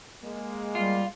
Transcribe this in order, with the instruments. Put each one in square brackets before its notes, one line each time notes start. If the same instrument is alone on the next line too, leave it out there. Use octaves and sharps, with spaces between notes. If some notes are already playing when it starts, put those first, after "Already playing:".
[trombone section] G#3 A#3
[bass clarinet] G3 [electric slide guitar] F4